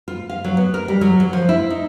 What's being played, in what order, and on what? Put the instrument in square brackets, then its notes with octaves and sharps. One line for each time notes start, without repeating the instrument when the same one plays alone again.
[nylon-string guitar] F4
F5
F#3
B3
A#4
G3
F#3
F#3
F3
E4
D#4